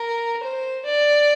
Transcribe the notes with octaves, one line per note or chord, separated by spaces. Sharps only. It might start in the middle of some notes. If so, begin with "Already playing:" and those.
Already playing: A#4
C5
D5